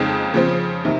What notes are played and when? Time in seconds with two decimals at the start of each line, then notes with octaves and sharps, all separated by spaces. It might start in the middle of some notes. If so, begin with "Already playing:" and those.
Already playing: F2 C#3 G#3 C4 D#4
0.34 C#3 F3 C4
0.85 C3 D#3